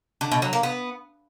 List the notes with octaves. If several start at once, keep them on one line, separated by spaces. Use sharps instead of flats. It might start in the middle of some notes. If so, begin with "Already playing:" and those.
D3
B2
F#3
A#3
B3